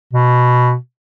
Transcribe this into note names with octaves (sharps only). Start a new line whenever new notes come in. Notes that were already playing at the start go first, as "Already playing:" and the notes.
B2